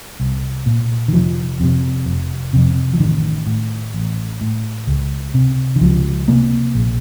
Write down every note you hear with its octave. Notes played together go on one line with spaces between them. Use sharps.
C2
A#2
D#3
F1 F3
F2 C3
F1
F2 C3
F3
A1 D#3
A2
A1
A2
C#2
C3
D#3
C#2 F3
C3 A#3
A#1